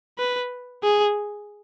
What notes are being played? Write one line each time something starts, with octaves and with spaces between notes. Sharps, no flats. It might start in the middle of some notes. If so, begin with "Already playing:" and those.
B4
G#4